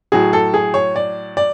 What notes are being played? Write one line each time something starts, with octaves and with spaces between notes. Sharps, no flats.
A2 F#3 G#4
A4
G#4
C#5
D5
D5